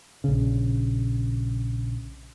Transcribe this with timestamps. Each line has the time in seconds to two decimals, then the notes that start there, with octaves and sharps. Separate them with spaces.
0.24 A#1 C#3